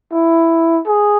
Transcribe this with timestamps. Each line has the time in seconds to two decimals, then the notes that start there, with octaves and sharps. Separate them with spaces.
0.12 E4
0.87 G#4